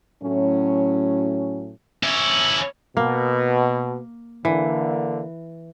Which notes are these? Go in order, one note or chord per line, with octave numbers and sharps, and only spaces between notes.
A2 F#3 C#4
C#4 E4
B2 A#3
D3 E3 A#3